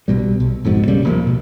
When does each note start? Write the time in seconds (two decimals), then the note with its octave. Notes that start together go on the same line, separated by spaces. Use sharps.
0.08 B1 B2 G3
0.40 B1
0.65 F#1 F2 G#2 B2
0.88 A#1 A#2 C#3 G3
1.05 D#1 F3 A#3
1.27 B2